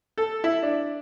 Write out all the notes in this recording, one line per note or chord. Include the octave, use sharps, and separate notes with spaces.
A4
E4
D4